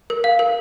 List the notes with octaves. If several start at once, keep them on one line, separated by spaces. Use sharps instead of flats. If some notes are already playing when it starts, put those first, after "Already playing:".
A#4
F5
A#4